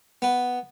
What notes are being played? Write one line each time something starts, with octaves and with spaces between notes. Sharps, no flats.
B3